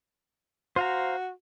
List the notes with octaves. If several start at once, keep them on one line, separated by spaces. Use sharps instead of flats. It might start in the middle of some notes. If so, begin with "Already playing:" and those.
F#4 C5 F5 A#5